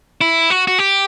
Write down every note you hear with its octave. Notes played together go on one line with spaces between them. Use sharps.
E4
F#4
F#4
G4